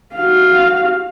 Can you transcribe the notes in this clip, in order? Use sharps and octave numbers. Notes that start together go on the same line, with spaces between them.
F#4 F5